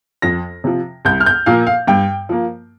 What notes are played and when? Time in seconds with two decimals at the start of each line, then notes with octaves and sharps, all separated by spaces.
0.22 F2 A#6
0.64 C3 F3
1.05 C2 G6
1.20 F6
1.26 G6
1.46 A#2 F3 A#3 F5
1.67 F5
1.87 G2 G5
2.29 F3 A#3